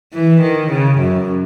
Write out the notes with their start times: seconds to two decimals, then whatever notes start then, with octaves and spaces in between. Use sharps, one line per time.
0.13 E3
0.41 D#3
0.71 C#3
0.99 F#2